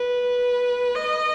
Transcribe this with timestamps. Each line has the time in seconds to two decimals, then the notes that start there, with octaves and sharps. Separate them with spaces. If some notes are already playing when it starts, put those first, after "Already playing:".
Already playing: B4
0.95 D#5